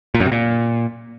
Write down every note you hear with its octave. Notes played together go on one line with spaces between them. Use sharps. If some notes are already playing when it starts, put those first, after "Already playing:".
A#2
F#2
C3
A#2